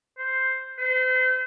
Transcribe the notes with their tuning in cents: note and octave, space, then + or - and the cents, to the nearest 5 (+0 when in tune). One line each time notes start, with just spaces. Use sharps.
C5 +0
C5 -35